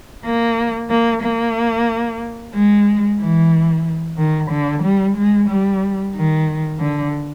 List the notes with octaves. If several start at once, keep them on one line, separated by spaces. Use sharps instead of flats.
A#3
A#3
A#3
G#3
E3
D#3
D3
G3
G#3
G3
D#3
D3